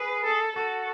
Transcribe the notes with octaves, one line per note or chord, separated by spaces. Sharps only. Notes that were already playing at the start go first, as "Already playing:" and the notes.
Already playing: G#4 B4
A4
F#4 A4